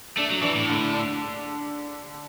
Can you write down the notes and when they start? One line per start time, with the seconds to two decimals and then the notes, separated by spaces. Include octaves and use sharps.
0.17 A3 D4
0.30 F#3
0.42 E3 D4
0.55 A2
0.68 D3
0.93 D4